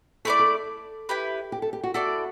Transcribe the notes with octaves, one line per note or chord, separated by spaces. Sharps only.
A3 E4 A4 B4 D5
A4
E4 G4 B4
G4
A4
G4
F#4
E4 F#4 A4 D5